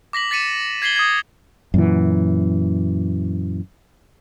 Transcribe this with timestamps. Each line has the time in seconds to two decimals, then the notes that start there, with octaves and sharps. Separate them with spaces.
0.13 D6 A#6 B6 F#7
0.31 A6 B6 C#7 D#7 E7
0.82 G#6 B6 C7 F#7 G7
0.96 D#6 G#6
1.74 F#2 A#2 E3